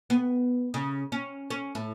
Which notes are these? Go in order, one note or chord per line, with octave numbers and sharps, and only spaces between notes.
B3
C#3
C#4
C#4
A2